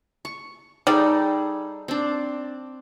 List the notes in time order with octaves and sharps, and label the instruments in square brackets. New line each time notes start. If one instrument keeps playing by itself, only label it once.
[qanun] C#6
[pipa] G3 [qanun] D#4 G#4 A4
[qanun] C4 D4